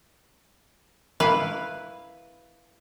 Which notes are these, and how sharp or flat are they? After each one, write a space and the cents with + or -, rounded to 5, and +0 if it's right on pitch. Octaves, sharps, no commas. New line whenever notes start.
E4 +0 B4 +0 F5 +0